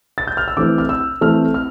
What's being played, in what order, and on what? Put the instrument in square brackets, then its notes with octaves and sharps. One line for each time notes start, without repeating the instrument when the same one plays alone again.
[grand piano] A6
G6
F6
E6
E3 A3 C4 D6
F6
E6
E3 A3 C4 F6
F6